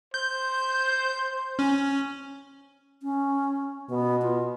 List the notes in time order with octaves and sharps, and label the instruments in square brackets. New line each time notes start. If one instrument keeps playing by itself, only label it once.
[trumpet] C5 [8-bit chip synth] G6
[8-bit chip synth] C#4
[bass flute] C#4
[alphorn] B2 [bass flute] B3
[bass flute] F4